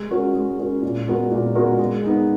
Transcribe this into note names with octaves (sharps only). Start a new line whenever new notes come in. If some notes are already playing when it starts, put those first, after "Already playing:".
Already playing: G#3
C#4 F#4 A#4
G#3
C#4 F#4 A#4
A#2
G#3 B3 F#4 A#4
A#2
G#3 B3 F#4 A#4
G#3
B3 D#4 G#4